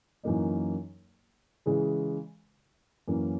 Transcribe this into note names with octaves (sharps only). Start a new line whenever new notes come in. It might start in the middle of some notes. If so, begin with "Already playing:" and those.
F#2 E3 A#3 D#4
C#3 E3 G#3
F#2 E3 A#3 C#4